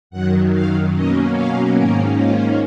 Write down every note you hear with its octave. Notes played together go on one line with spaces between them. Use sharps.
F#2 D#3 F#3 F#5
F5
B2 F#3 A#3 C#4 D#5
F5
G#2 D#3 A#3 C#4 A#4
F4